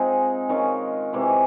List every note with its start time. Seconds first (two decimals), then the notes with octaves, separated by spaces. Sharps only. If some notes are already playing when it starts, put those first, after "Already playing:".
Already playing: G#3 C4 D#4 F4 G#4
0.49 D#3 G#3 C#4 F4
1.13 C3 E3 G#3